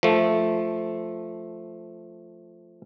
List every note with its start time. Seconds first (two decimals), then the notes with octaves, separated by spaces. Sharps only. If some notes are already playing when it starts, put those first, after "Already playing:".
0.03 F3 A3